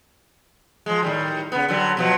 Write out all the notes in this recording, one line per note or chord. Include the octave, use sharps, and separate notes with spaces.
F3 G#3
A2 D#3 G3
C#3 B3
D3 F#3 G3
B2 F3 F#3